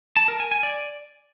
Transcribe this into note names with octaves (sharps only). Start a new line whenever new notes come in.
A5
A#4
G#5
G#5
D5